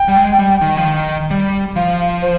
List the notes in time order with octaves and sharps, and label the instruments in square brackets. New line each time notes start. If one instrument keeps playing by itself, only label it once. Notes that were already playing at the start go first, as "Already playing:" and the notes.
Already playing: [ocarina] G5
[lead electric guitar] G3
G#3
G3
D#3
F3
D#3
G3
[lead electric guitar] F3 [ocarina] F5
[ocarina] C5